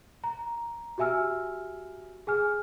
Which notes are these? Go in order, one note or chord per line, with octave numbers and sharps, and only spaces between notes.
A#5
F#4 G4 E5 G#5 E6 F6
G#4 G#5 F6